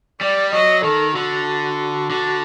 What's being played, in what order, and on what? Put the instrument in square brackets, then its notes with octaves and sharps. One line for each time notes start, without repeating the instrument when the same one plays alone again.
[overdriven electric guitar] G3 [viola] D5
[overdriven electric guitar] F#3 [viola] D#5
[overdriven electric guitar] D#3 [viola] A4
[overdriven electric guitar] D3 [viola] F#4
[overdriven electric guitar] D3